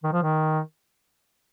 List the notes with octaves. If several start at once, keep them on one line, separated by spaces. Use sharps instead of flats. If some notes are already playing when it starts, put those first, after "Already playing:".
D#3
F3
D#3